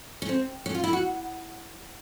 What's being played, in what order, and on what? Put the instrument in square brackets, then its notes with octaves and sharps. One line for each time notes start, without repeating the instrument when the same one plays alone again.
[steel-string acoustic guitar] C#4
C4
C#4
F4
E4
F#4